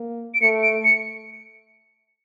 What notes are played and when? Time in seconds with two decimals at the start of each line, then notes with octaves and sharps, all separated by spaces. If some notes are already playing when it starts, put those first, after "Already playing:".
Already playing: A#3
0.34 D7
0.41 A3 C#7
0.62 D7
0.84 C#7